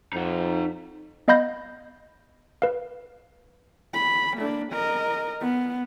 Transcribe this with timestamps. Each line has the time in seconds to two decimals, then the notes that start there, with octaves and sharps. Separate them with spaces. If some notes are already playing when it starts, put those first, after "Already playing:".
0.13 F2 D#4 F#5
1.28 B3 D#5 F5 B5 G6 A#6
2.62 B4 F5
3.94 B5
4.37 A#3 D4
4.72 A#4 D#5
5.40 B3